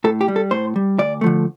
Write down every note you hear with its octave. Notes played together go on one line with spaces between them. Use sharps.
A2 A4
G4
G3
A4
A2 C5
G3
D2 D5
D3 F3 A3